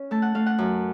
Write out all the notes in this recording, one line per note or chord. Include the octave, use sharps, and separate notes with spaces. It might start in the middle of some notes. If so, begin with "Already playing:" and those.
Already playing: C#4
A3 A5
F#5
A3 F5
F#5
F#2